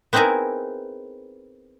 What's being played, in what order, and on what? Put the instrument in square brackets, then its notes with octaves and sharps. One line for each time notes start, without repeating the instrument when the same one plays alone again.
[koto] B3 C4 D#4 E4 G#4 A#4